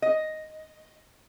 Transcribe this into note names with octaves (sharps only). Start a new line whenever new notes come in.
D#5